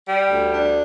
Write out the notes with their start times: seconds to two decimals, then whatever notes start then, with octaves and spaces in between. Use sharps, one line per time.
0.07 G3
0.30 D2
0.52 D4